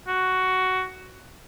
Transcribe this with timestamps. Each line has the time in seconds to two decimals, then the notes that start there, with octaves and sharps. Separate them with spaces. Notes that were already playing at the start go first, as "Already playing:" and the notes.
0.07 F#4